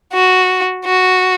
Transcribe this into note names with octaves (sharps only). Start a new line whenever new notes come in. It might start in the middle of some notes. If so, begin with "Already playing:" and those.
F#4
F#4